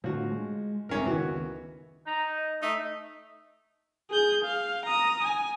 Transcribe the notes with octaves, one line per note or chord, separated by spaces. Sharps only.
A2 D3 F3 F#4
G#3
G1 F2 G#2 C3 C#4 A#4
F#1 C#2 D#3 E3 B3 F#4
D#4 A#5
D#5
A3 D#4 E5
G#4 G6
F5
A#5 D#6
G#5